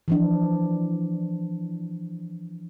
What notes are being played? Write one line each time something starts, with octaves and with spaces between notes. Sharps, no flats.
E3 F3 D4